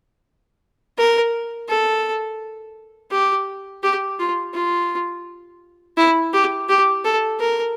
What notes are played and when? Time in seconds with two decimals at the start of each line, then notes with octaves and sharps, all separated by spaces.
0.98 A#4
1.69 A4
3.12 G4
3.83 G4
4.19 F4
4.54 F4
5.97 E4
6.33 G4
6.69 G4
7.05 A4
7.40 A#4